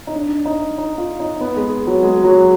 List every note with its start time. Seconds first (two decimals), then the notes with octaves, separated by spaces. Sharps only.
0.07 D#4
0.15 D4
0.45 D#4
0.78 D#4
0.98 F4
1.20 D#4
1.41 B3
1.56 G#3
1.87 F#3
2.03 G#3
2.24 F#3